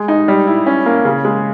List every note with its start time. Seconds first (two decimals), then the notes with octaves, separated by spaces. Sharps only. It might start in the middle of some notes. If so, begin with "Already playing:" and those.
Already playing: G#3
0.08 D#4
0.28 G3
0.47 E4
0.66 C#4
0.86 A#3
1.05 C#3
1.25 G#3